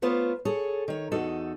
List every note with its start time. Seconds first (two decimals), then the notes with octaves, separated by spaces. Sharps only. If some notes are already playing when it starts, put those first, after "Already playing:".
0.02 A3 B3 F4 C5 C#5
0.45 G#4 A4 C#5
0.88 D#3 C#5
1.12 E2 D#4 F#4 A4